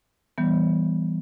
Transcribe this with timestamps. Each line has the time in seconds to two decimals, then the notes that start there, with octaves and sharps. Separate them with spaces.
0.38 E3 G3 B3